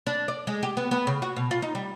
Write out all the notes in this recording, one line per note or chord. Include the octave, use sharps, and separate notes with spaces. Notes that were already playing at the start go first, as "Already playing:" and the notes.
D4
D5
G#3
G4
B3
B3
C#3
F#4
B2
F4
D#4
G3